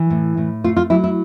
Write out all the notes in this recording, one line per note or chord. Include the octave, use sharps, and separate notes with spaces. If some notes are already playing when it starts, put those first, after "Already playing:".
Already playing: E3
A2
A2
A3 F4
F4
F#3 E4
E4